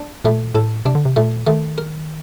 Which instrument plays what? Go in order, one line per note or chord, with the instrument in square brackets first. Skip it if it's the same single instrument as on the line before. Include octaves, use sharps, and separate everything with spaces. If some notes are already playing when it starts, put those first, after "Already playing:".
Already playing: [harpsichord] D4
[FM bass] A#2 [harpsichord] A3
[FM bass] A2 [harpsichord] A4
[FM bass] C3 [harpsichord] D4
[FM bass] D3
C3
[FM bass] A#2 [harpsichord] A3
[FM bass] D#3 [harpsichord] A3
[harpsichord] A#4